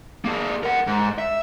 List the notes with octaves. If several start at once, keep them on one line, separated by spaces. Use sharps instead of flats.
A#3 G#4
A#4 F#5
G#2
E5